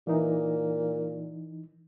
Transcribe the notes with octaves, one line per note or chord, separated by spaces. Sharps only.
A#2 E3 D#4